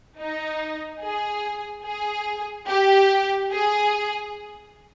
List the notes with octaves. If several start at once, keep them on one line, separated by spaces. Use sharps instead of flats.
D#4
G#4
G#4
G4
G#4